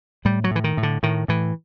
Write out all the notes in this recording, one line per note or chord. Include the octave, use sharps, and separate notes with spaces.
A2 G3
F#3
A2 E3
D#3
A2
D3
A2 D#3
A2 E3